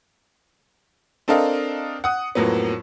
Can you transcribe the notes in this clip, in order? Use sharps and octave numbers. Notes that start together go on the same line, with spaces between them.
C4 D4 A4 A#4 D#5 F5
F#5 D#6
F2 A2 F#3 A#3 B3